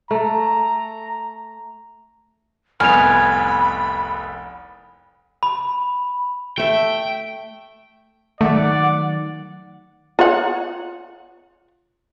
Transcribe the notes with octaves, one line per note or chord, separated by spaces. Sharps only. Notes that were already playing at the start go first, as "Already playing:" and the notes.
A3 A#5
F1 C2 B3 G#5 B5 F6 F7
B5
A3 E5 G5
D#3 F#3 A3 D5 F#5
F4 C#5 F#5